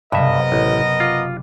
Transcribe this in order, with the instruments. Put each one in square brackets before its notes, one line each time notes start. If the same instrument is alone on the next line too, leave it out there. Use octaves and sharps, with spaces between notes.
[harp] F#1 C3 [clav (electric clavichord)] G2 E5 [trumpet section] B3 A#4 D#5
[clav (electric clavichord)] A1
[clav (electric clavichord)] F4 [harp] D6